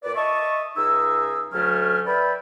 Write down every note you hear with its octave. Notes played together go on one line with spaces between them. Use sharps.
A#2 B4 D5
D#5 E5 A5 C#6
C#2 D#4 G#4 E5 E6
D2 F#3 A3 C#4 F6
B4 D5 E5 G5 B5